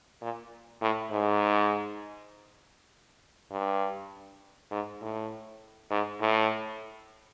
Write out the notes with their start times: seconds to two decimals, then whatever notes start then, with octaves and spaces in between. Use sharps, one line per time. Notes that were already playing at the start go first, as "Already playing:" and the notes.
0.22 A#2
0.82 A2
1.11 G#2
3.51 G2
4.71 G#2
5.01 A2
5.91 G#2
6.21 A2